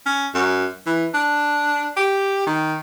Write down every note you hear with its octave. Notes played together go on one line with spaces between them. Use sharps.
C#4
F#2
E3
D4
G4
D#3